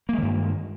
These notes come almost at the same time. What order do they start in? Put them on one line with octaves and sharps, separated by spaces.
A#3 G#3 D#3 G2